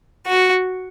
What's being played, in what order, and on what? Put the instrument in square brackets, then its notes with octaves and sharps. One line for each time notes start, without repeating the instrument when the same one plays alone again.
[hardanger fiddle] F#4